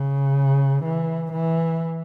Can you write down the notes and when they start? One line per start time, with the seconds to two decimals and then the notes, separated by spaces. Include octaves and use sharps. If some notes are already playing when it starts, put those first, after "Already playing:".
Already playing: C#3
0.84 E3
1.33 E3